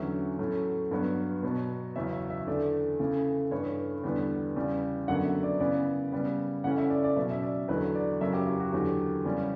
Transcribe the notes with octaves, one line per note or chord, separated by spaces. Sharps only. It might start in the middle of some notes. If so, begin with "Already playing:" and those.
Already playing: E2 D3 F#3 C#4 E5
A2 F#3 A3 C#4
G2 F#3 B3
B2 F#3 B3
E2 C#3 F#3 C#4 E5
E5
E5
E2 D3 A3 D5
C#3 E3 A3
G2 E3 A3 C#5
E2 D3 G3 B3
E2 C#3 G3
F#2 D3 F#3 B3 F#5
E5
D5
C#3 E3 B3 D5
C#3 G3 B3
C#3 E3 A3 C#4 F#5
E5
D5
D5
B2 F#3 C#4 E5
E5
D5
E2 D3 F#3 A3 B4
D5
F#2 C#3 F#3 C#4 E5
G4
E4
F#4
E2 D3 F#3 A3 G4
E2 C#3 G3 C#4